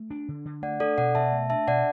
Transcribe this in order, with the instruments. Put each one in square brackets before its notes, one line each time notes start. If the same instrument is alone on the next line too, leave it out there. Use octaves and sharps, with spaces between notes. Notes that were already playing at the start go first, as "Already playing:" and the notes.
Already playing: [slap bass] A3
D4
D3
D3
[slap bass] A3 [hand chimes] D5 F#5
[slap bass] D4 [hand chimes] A4 D5
[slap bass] B2 [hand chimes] D5 F#5
[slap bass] B2 [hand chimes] E5 A5
[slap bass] A3
[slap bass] D4 [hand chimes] E5 A5
[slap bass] B2 [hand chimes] D5 F#5